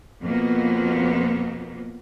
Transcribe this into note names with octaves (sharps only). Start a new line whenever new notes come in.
F2 B2 A#3 B3